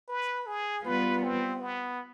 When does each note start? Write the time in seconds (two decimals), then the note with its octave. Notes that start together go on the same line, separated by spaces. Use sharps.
0.08 B4
0.47 G#4
0.84 G3 B3 F4 B4
1.23 C4
1.61 B3